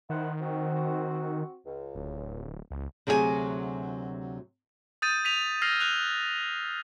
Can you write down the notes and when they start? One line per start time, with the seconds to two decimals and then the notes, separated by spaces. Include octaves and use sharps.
0.10 D#3 E4 C5 F#5
0.40 C4 F#4
1.66 C#2
1.95 D1
2.71 C#2
3.07 D2 C3 F#3 G#4 A#4 G#5
5.02 D#6 G6 A6 D#7
5.25 B6 D#7 F7
5.62 E6 F6 G#6 A#6 C7 F7
5.80 F#6 F7